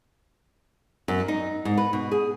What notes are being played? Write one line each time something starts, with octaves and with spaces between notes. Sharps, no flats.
F#2
D#4
G#2
B4
B2
G#4